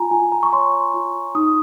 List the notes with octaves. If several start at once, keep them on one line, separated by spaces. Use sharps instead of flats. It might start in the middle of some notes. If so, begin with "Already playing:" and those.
Already playing: F4 G#5 A#5
F4 G#5
A#5
C#6
C#5 C6
F4
D#4 D#6